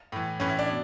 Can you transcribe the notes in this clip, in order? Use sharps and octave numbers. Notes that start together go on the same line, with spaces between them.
A2 E3
A2 E3 C#4
E4
D4
B2